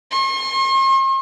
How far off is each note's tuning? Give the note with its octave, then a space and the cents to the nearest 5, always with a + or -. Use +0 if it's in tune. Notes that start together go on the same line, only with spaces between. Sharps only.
C6 +45